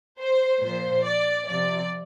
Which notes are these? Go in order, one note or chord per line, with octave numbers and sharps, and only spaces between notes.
C5
A#2 F3 C5
D5
C3 F3 D5